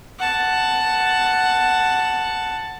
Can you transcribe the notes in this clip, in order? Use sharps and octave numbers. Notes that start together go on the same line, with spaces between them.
F#5 A5